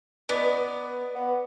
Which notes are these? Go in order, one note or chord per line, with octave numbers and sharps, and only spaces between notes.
B3 D5 D#5 D6
B3